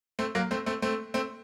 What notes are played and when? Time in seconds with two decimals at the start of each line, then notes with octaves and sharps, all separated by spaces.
0.19 A3 C4
0.35 F#3 A#3
0.51 A3 C4
0.66 A3 C4
0.82 A3 C4
1.14 A3 C4